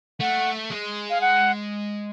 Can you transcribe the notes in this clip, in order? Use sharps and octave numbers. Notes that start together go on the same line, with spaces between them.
A3 F#5
G#3
F5
F#5